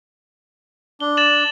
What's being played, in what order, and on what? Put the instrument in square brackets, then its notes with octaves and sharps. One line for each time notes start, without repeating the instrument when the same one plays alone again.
[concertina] D4 [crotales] G7
[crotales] A6 E7 F#7